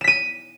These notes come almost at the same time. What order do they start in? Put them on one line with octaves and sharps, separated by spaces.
E7 B6 D#7